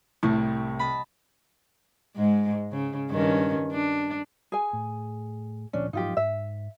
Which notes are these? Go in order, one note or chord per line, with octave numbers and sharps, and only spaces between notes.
C2 A2
D#5 A5 B5
G#2 G#3
C#3
G2 D#3 C#4
D4
G#4 G#5
A2
D1 A#2 F3 C#4 D4
G#2 F3 F#3 D#4 F4 G4
G#2 E5